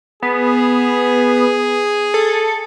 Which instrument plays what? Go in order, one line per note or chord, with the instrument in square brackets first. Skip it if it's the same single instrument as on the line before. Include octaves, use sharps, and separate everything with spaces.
[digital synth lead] B3 [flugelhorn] G#4
[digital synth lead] A4